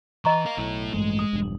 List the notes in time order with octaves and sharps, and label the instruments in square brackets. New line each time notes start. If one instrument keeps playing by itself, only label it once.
[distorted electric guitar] E3 [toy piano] D#5 A#5 C#6
[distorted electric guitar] A#4 F5
[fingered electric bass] B1 [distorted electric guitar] A3 E4
[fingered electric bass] A1 G2 A3 [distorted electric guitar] G#3
[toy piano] D#6
[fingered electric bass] E1 G2